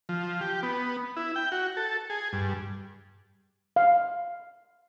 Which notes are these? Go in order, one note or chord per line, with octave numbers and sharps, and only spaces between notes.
F3
G4
B3
E4
G5
F#4
A4
G#4
G2
F5